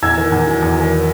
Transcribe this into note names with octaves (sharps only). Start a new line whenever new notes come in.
E2 E6 G#6
D#3
E2
F#3
E2
D#3